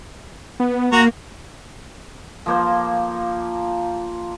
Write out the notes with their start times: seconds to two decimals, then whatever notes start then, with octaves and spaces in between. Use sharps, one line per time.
0.60 B3
0.92 A#3 F#4 A#5
2.46 F3 A#3 C5